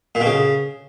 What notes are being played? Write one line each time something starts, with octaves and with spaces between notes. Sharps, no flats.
A#2
B2
C#3